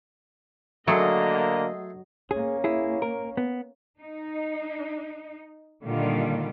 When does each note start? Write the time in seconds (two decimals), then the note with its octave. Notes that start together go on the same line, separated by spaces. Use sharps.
0.88 D3 F#3 A3 A#3 G#4 D#5 C6
2.31 A#3 C#4 G#4
2.64 E4 G#4
3.02 A#4
3.37 B3
4.00 D#4
5.84 A#2 D3 D#3 G3 F4